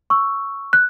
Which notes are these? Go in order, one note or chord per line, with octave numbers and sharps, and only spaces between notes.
C#6 E6
F#6